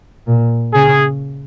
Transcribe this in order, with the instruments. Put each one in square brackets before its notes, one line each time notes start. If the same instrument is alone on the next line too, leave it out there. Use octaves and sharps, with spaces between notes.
[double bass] A#2
[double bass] C#3 [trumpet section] G#4